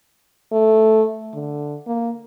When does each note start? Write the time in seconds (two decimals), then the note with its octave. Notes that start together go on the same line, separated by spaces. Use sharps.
0.53 A3
1.34 D3
1.87 A#3